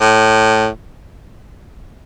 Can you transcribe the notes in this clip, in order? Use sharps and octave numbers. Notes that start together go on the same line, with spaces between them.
A2